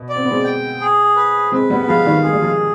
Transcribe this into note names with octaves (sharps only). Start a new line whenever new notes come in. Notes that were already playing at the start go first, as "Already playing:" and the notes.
Already playing: B2
D5
C4
B3
G#3 C4
G5
G#4
B4
G#3 C4 B4
G3 B3
B3
F3 G#3 F5
D#3 G3
G#3 G#4
G3
F3 G#3